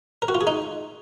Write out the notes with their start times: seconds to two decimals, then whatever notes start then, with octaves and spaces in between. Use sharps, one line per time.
0.22 A#4
0.28 F#4
0.35 F4
0.41 G#4
0.47 D#4